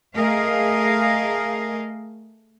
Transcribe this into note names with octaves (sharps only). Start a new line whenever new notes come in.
A3 G#4 A#4 D#5 F5